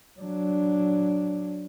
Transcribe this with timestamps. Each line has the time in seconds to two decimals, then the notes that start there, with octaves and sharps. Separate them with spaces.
0.20 F#3 D4